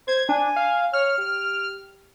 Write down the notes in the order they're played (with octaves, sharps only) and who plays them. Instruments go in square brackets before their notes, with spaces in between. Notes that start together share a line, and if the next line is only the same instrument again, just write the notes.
[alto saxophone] C5 [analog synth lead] G#6
[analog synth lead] D4 [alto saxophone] G#5
[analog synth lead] F5
[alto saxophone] C#5 [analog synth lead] F6
[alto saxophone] G4